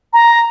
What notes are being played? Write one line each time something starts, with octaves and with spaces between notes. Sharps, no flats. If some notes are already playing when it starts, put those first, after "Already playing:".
A#5